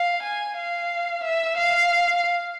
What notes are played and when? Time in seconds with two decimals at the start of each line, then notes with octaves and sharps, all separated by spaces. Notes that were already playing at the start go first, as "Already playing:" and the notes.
Already playing: F5
0.23 G#5
0.57 F5
1.24 E5
1.57 F5